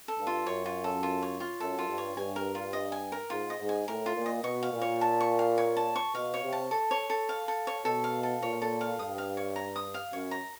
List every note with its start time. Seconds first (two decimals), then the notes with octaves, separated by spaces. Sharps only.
0.08 A4
0.18 G2
0.27 F4
0.46 F#2 C#5
0.66 F4
0.84 A4
1.03 F4
1.22 C#5
1.40 F4
1.60 F#2 A4
1.78 F4
1.89 G2
1.98 C#5
2.17 G2 G#5
2.36 A#4
2.55 F4
2.73 D#5
2.92 G#5
3.12 A#4
3.30 G#2 F4
3.50 D#5
3.59 G#2
3.69 G#5
3.88 A2 A#4
4.06 F4
4.16 A#2
4.26 D#5
4.44 B2 C#6
4.63 F5
4.73 A#2
4.82 C#5
5.01 A5
5.20 C#6
5.39 F5
5.58 C#5
5.77 A5
5.96 C#6
6.15 B2 F5
6.34 C#5
6.43 C3
6.53 A5
6.71 A4
6.91 C#5
7.10 A4
7.29 F5
7.48 A4
7.67 C#5
7.85 B2 A4
8.04 F5
8.23 A4
8.43 A#2 C#5
8.62 A4
8.81 F5
8.99 G2 D#6
9.18 F5
9.37 C#5
9.56 A#5
9.76 D#6
9.94 F5
10.13 F#2 C#5
10.31 A#5